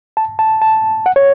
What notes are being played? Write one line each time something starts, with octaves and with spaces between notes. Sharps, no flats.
A5
A5
A5
F#5
C#5